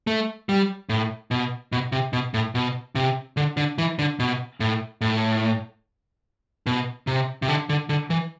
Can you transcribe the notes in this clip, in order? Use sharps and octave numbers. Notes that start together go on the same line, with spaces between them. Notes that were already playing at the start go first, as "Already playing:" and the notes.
A3
G3
A2
B2
B2
C3
B2
A2
B2
C3
D3
D3
E3
D3
B2
A2
A2
B2
C3
C3
D3
D3
D3
E3